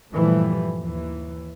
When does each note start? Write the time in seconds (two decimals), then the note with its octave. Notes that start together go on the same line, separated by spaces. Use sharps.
0.13 G2 A#2 E3 F3 G3 A3
0.80 D#2 E3